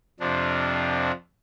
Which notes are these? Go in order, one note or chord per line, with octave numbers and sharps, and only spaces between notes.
F2 C3 F3 D4